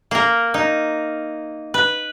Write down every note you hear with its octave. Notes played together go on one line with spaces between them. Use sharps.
A#3 A#4
D#4
B4